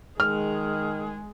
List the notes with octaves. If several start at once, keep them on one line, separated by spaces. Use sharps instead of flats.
D#3 G#3 G#4 F6